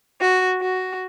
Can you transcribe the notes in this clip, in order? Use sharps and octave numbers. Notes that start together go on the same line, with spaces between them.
F#4
F#4